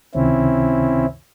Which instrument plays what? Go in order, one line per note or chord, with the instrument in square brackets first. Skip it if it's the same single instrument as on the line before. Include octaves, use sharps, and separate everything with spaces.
[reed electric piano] C#2 C3 D#3 [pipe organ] C4 C#4 E4